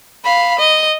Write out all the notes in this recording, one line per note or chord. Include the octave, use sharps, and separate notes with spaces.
F5 B5
D#5